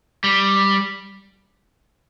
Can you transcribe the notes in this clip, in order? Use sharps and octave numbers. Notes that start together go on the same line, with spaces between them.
G3